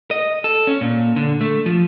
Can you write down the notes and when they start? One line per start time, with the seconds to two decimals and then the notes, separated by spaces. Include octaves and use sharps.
0.11 D#5
0.44 A4
0.67 C#4
0.81 A#2
1.16 D3
1.41 A3
1.66 F3